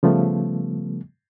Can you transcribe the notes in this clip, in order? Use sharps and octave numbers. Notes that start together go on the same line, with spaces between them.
C#3 F3 G3 A3 B3